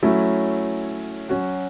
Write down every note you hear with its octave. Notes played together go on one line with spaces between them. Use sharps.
F#3 A3 C#4 E4
F#3 C#4 F#4